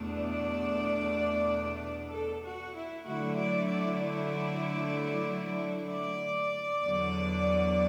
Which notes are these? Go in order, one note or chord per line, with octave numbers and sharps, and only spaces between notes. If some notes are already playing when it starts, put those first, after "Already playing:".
Already playing: E2 B2 A3 D4
D5
A4
F#4
E4
D3 F#3 A3 E4 F#4
D5
D5
D5
D5
E2 D3 F#3